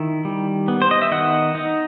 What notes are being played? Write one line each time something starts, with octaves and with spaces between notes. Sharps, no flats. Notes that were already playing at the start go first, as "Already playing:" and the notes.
Already playing: D#3 E4
G3
B3
C5
D#5
E5
D#3 D#5 F#5
D#4